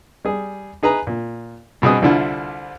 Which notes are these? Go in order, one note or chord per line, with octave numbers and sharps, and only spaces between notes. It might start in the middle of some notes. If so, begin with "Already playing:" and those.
G3 G#4
D#4 G#4 B4 A#5
A#2
G2 B2 C4 G#4 D#5 D#6
C2 D3 D4 E4 F4